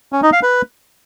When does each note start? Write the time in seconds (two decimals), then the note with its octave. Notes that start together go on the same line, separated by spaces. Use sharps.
0.13 C#4
0.23 D#4
0.33 F5
0.43 B4